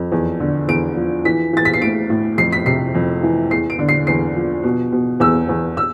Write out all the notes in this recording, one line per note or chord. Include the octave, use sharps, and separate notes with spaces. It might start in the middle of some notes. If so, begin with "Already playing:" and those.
Already playing: F2
E2
D3
E2 D7
F3
E3 B6
E3 A6
B6
C7
A2 D7
A2
F2 C7
B6
C3 C7
F2
E3
E2 C7
D7
D3
C7
E2 C7
F3
B2
B2
E2 E6
E2
E6